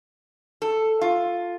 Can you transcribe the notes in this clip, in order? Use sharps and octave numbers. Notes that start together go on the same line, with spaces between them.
A4
F4